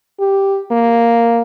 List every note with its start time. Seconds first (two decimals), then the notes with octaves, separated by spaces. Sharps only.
0.20 G4
0.71 A#3